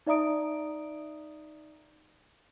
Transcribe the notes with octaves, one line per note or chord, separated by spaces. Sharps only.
D#4 D5 E5 A#5 D#6 D7